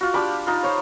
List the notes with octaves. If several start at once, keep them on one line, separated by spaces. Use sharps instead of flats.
F4 F#4
D4 G4 B5 D6
D#4 F4
C5 C#5